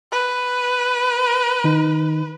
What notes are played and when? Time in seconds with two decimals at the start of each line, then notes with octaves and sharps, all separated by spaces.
0.12 B4
1.64 D#3 D#4